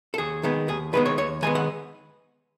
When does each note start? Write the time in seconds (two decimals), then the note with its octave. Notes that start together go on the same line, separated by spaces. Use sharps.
0.14 A4
0.18 D#2 G#4
0.43 D#3 G#3 B3
0.68 D#2 G#4
0.93 D#3 G#3 B3 B4
1.06 C#5
1.18 D#2 C#5
1.42 D#3 G#3 B3 G#5
1.55 F#5